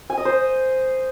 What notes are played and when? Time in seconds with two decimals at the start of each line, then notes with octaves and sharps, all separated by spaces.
0.10 G#5
0.17 D#5
0.25 C5